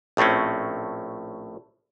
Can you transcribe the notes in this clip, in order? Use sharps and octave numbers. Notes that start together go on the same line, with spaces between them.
A#1 A2 A3 C4 C#4